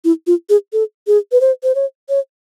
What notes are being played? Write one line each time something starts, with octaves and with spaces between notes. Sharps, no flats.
E4
F4
G#4
A4
G#4
B4
C5
C5
C#5
C#5